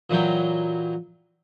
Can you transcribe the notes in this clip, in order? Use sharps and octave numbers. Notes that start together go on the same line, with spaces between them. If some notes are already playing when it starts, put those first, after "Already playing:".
A#2 E3 F#3 G5